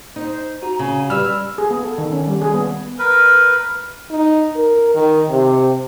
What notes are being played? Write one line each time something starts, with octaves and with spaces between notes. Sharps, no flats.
D#4 C5
F#4 A#5
C#3 G#5
G3 B4 E6 F6
G#4
B3
A4
D#3
C#4
G3
G#4
B3
A#4 B4
D#4
A#4
D#3
C3